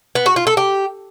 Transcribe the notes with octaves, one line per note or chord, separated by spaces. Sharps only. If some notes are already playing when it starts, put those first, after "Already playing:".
B3
F#4
F4
A4
G4